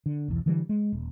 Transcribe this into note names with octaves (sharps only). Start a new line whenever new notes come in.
D3
B1 E2
D3 E3 G3
G#3
D#1